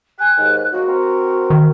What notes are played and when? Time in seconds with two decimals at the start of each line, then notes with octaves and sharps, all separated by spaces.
0.19 G5 G#5 F#6
0.37 D#2 G#2
0.72 F#3 G#3 A#3 F#4
0.87 C4 A#4
1.50 D#3